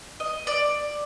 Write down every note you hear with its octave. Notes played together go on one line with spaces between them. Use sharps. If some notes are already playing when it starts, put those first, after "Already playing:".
D#5
D5